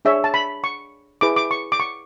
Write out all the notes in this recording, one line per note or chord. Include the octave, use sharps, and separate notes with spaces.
D4 G#4 C#5 E5
A5
B5
C#6
E4 G#4 B4 D6
D6
C#6
D6
C#6